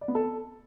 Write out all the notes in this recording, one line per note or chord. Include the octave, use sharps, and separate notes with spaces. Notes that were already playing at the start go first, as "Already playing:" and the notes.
D5
B3
A4